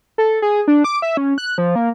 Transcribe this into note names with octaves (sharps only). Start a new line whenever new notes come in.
A4
G#4
D4
D6
E5
C#4
F#6
F3
A#3